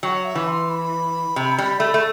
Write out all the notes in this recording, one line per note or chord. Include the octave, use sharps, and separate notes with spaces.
F#3 F#5 G5
E5
E3
C6
B5
C3
G3
A3
A3